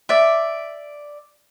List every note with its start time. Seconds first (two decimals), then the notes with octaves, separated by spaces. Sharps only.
0.09 D5 E5